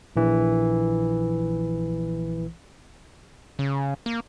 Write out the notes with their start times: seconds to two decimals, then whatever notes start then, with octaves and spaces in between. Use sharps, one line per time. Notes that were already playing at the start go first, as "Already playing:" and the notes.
0.16 A#1 E3
3.59 C#3
4.06 A#3